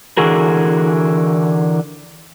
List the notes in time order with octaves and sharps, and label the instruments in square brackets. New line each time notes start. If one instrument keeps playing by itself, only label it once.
[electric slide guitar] D3 E3 F#4 G#4 A#4